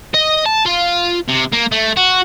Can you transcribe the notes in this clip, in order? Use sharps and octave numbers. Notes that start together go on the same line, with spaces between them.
D#5
A5
F4
C3
A#3
A3
F#4